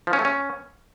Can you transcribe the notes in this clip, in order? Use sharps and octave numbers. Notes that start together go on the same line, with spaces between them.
F3
C#4
A3
C#4